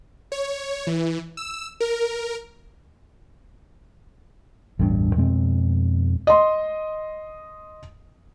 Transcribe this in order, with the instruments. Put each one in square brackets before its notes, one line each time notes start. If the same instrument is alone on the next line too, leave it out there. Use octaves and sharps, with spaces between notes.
[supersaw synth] C#5
E3
E6
A#4
[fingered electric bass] A1 E2 G2 D4
F2 B2 G#3 C4
[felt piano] D#5 C6